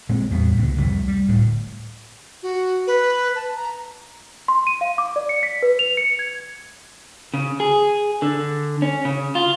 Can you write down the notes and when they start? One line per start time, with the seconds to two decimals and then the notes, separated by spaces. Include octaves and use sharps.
0.09 A#2 G#3 C4
0.31 E2 A2 G3 B3
0.57 C#2 G2 A#2 D3
0.77 C2 F2 G3 A3
1.08 G3
1.28 D1 D2 A2
2.43 F#4
2.87 B4
3.36 A5
3.56 A#5
4.48 C6
4.67 D#7
4.81 F5
4.98 D6
5.16 D5
5.29 C#7
5.43 B6
5.63 B4
5.79 F7
5.97 C#7
6.19 G#6
7.34 C#3
7.60 G#4
8.22 D3
8.82 C#4
9.05 C#3
9.35 F4